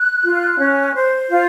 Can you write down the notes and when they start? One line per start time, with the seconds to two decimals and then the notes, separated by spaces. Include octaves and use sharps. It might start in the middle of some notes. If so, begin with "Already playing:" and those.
Already playing: F#6
0.23 F4
0.58 C#4
0.94 C5
1.30 F4